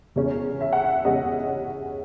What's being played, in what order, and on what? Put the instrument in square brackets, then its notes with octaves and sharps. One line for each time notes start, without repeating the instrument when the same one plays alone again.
[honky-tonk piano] E2 C#3 G#3 C#4
E5
F#5
E5
E2 C#3 G#3 C#4 D#5